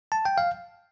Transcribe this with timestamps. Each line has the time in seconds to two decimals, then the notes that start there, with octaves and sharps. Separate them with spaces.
0.12 A5
0.25 G5
0.38 F5